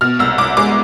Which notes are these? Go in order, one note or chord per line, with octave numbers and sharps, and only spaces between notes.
B2 F6
C2 E6
C2 D6
G#3 D6